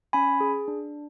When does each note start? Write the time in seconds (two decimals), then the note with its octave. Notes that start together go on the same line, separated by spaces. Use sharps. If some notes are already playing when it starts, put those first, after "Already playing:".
0.13 C#4 G#5 B5
0.41 G#4
0.68 D4